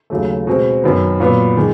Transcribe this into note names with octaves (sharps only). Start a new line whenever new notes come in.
D#2 C#3 F#3 A3
B2 G#3 C4
F#2 D#3 F#3 B3
A#2 F#3 B3
D#3 G#3